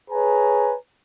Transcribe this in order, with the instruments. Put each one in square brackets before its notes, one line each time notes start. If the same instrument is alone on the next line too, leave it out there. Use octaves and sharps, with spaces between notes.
[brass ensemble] G#4 B4 C#5 G#5 A#5